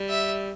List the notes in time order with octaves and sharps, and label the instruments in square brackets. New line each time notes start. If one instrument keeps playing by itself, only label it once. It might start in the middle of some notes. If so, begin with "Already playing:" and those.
Already playing: [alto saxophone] G3
[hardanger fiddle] E5